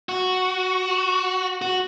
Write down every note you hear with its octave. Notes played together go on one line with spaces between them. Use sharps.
F#4
F#4